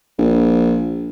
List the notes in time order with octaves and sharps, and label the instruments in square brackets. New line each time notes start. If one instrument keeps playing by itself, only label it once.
[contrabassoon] A#1